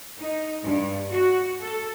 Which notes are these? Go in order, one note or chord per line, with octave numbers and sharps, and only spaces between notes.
D#4
G2
F#4
A4